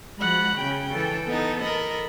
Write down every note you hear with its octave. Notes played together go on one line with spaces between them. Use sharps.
F3 G#3 F#4 F#5 B5
C#3 C#4 G5
E3 A4
B3 D#4
A#4 D#5 B5